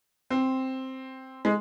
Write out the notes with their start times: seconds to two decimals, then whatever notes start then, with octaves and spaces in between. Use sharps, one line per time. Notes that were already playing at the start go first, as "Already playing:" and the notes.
0.30 C4
1.45 G#3